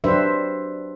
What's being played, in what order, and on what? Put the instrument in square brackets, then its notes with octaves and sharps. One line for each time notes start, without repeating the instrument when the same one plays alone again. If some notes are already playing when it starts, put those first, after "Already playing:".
[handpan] F#3 D4 G4 B4 C5 E5